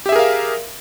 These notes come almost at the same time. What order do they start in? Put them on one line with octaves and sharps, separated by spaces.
G4 E5 G#4 A#4 F5